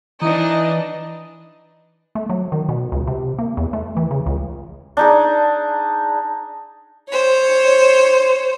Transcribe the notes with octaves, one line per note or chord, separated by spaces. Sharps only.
E3 D4 D#4 D#5
A3
F#3
D#3
B2
C#2
C3
A#3
E2
A3
E3
C#3
C#2
D4 D#4 G#4
C5 C#5